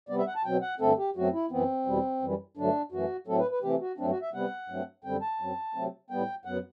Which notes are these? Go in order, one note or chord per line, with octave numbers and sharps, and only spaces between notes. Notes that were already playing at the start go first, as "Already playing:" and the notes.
C3 G3 B3 D5
E5
F#5
A5
B2 F#3 C4 G5
F#5
G2 D3 A3 C4 A4
G4
F#2 F#3 A3 C4 F#4
E4
F#2 E3 B3 C4
E2 B2 G3
F#2 E3 G3
G2 D3 F#3 A3 D4
F#2 E3 A3 F#4
A2 F#3 A3 C4 A4
B4
B4
C3 E3 A3 C4 G4
F#4
G2 F#3 A3 C4 D4
F#4
E5
C3 G3 B3 F#5
G2 F#3 A3 C4
F#2 D3 G3 C4 G5
A5
F#2 F#3 C4
C3 F#3 A3 C4
A2 G3 B3 G5
F#2 F#3 B3 F#5